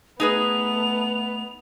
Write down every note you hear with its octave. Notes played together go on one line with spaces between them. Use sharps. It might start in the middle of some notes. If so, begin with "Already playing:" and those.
A3 B3 D#4 G#4 B4 F7